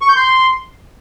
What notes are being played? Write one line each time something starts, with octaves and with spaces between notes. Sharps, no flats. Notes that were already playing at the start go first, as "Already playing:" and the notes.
C#6
G6
C6